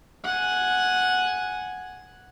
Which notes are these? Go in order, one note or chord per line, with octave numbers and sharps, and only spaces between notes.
F#5 G#5